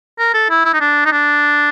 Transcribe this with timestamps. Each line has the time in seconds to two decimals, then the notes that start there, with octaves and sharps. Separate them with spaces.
0.19 A#4
0.34 A4
0.50 E4
0.65 E4
0.74 D#4
0.81 D4
1.05 D#4
1.12 D4